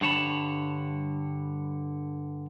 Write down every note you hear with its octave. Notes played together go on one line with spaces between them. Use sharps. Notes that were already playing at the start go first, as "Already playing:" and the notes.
G2 D3 C#5 A5 B5